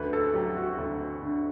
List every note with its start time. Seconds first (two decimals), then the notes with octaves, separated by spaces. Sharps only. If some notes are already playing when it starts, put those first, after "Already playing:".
Already playing: D2 B4
0.13 A4
0.34 F#3 G4
0.57 F#4
0.78 D2
1.22 D3